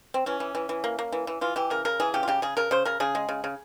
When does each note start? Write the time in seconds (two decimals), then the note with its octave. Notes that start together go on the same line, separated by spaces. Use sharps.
0.14 C4
0.26 E3 C#4
0.40 E3
0.55 E3
0.69 E3
0.84 A#3
0.99 A#3
1.12 E3
1.27 E3
1.41 E3 F4
1.56 E3 G4
1.70 C#3 A#4
1.85 C#3 A#4
2.00 E3 G#4
2.14 C#3 G4
2.23 F4
2.28 C#3 G4
2.42 C#3 G#4
2.57 C#3 A#4
2.71 C#3 C5
2.85 C#3 A#4
3.00 C#3 G#4
3.15 G#3
3.29 C#3
3.44 C#3